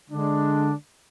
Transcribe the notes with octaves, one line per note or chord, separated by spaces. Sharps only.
D3 G#3 D4